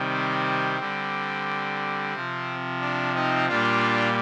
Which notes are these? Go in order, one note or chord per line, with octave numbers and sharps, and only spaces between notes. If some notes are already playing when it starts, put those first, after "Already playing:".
Already playing: C3 D#3 G3
C4
D3 G3
C3 F3
D4
C4 D#4
A#2 G3 D4 F4